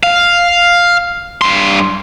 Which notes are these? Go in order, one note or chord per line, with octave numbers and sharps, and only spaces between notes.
F5
G2 C6